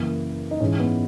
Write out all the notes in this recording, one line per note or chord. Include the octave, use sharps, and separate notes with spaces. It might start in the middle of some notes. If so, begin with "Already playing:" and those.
Already playing: F#2 C#3 E3 A#3
D#4
G#2 E3 G#3 C#4
B3